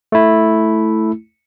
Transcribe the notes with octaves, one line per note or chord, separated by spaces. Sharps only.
A3 E4